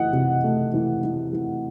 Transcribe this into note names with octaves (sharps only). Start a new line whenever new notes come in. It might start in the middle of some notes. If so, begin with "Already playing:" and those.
Already playing: E3 A3 D#5 F#5
C3
A3
E3
E3
E3